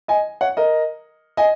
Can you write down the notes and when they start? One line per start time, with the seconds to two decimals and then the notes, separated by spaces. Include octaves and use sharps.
0.08 D#5 G#5
0.41 C#5 F#5
0.57 A#4 D#5
1.37 D#5 G#5